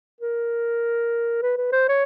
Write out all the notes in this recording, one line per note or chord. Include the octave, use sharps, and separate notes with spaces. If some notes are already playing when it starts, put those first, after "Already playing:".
A#4
B4
B4
C5
C#5